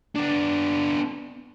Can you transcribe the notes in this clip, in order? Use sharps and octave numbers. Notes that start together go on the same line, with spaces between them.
B3 D4